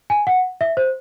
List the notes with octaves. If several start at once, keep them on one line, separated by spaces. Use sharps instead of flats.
G#5
F#5
E5
C5